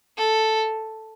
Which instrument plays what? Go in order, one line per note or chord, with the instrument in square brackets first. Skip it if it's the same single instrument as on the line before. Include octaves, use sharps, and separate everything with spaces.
[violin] A4